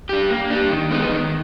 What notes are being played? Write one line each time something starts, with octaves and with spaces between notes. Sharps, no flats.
D4 G4
A#3
D4 G4
D#3
G#3 B3 D#4
D#3